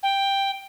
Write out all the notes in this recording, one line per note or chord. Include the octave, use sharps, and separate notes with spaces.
G5